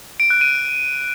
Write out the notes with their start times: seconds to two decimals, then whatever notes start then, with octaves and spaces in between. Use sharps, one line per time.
0.20 D7
0.30 F#6
0.41 D#7